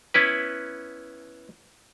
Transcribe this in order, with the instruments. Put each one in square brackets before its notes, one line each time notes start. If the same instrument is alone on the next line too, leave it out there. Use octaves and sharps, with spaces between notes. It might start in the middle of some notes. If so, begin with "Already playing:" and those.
[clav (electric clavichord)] B3 C#4 E4 B4